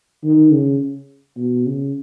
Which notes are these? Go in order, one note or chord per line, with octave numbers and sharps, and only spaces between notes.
D#3
C#3
B2
C#3